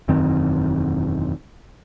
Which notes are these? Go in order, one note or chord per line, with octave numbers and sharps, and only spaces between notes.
E1 F#2 D#3 C4